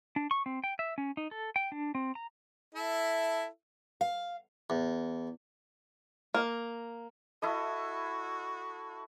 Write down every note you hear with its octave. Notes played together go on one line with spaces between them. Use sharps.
D4
C#6
C4
G5
E5
C#4
D#4
A4
G5
D4
C4
A#5
E4 A4 E5
F5
E2
A#3
E4 F#4 A4 D#5